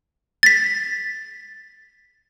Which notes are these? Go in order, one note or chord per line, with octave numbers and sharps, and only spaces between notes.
A6 B6